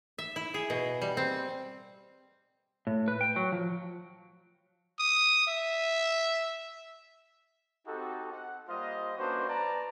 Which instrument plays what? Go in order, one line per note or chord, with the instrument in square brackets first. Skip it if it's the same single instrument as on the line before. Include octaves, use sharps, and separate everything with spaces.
[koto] E5
E4
G#4
B2
G3
C4
[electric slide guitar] A2
B4
G5
F#3
F3
[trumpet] D#6
E5
[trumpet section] C4 D#4 F#4 G4 A4
F#5
G3 A#3 F4 C5 D#5
A#3 C#4 D4 F#4 B4 C5
B4 D5 A5 A#5